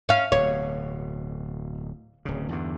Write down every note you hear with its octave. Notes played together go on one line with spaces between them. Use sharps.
C#4 F5
D1 B2 C#5
D1 C#3
E2 G2 D3